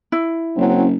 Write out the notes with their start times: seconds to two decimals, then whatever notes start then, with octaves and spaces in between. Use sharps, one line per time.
0.12 E4
0.57 F#1 F#3 C4 C#4